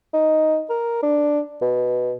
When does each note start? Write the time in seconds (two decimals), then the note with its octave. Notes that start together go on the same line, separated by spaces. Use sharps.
0.13 D#4
0.69 A#4
1.03 D4
1.61 B2